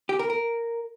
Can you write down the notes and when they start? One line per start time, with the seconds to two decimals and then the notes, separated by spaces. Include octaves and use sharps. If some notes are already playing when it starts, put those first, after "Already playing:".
0.09 G4
0.19 A#4
0.30 A#4